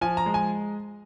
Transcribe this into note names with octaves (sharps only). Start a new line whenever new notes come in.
F3 G#5
A#5
G#3
G#5